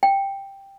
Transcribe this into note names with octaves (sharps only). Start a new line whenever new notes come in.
G5